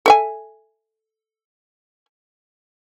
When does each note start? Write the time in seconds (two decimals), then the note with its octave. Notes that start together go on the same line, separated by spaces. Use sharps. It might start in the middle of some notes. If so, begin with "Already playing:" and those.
0.06 A4 E5 G#5